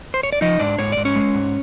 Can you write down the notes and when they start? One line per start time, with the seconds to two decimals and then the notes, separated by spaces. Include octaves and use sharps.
0.14 C5
0.23 C#5
0.32 D5
0.41 F3 D#4 D#5
0.59 G#2 D4 D5
0.79 G#2 C#5
0.92 G#2 D5
1.05 C#4 C#5
1.16 G#3
1.35 G#2